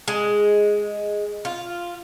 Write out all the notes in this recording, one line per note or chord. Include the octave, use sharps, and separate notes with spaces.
G#3
F4